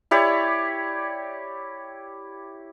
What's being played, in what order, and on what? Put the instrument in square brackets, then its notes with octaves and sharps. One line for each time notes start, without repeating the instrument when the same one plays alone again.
[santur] E4 G4 C#5 D5